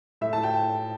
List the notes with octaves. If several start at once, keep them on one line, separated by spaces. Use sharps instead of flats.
A2 E5
A5
G5